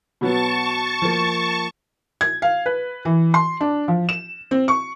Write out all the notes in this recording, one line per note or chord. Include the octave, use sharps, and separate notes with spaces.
B2 F#3 B3 A5 C#6
F3 A#3
G#6
F5
B4
E3
C6
D4
F3
E7
C4
C#6